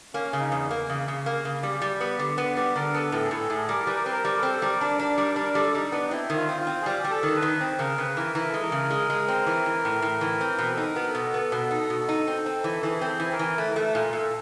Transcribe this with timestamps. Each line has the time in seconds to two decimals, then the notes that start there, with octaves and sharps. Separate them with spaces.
0.14 A#3 C#4
0.33 C#3
0.39 D#4
0.52 E2
0.71 A#3
0.89 C#3
1.08 C#3
1.26 A#3
1.45 C#3
1.63 G3
1.82 G3
2.00 B3
2.19 D3
2.38 B3
2.57 G3 G4
2.76 D3 A#4
2.94 B3 A4
3.12 A2 A4
3.24 G#4
3.31 A2 A4
3.49 A2 G#4
3.69 G3 A#4
3.87 G3 B4
3.96 A#4
4.03 C4 B4
4.13 A#4
4.25 G3
4.37 A4
4.43 C4
4.53 A4
4.62 G3 A#4
4.81 D4
4.99 D4
5.18 G3
5.36 D4 A#4
5.55 G3 A4
5.74 G3 D#4
5.92 B3 D4
6.05 D#4
6.11 C4 E4
6.30 D#3
6.36 F4
6.49 C4
6.60 F4
6.67 C4
6.82 G#4
6.86 G3 G4
7.04 G3
7.10 A4
7.23 D#3
7.36 B4
7.42 D#3
7.61 C4
7.79 C#3 A#4
7.98 C#3 B4
8.17 E3 A#4
8.35 E3 A#4
8.49 G#3 A4
8.62 A#4
8.72 C#3
8.90 G#3
9.10 G#3
9.28 C4
9.46 E3
9.66 E3
9.85 A2
10.02 A2
10.21 E3
10.41 C4
10.58 B2 B4
10.72 A4
10.77 D#4
10.84 A#4
10.96 B3
11.08 A4
11.15 B2
11.34 B3
11.52 B2
11.71 D#4
11.90 B2
12.09 D#4
12.27 C4
12.46 C4
12.64 E3
12.83 E3 G#4
13.01 C4 A4
13.08 G#4
13.20 E3
13.32 A#4
13.39 E3
13.57 A3 B4
13.71 A#4
13.75 A3 B4
13.95 A#2
14.13 A#2 A4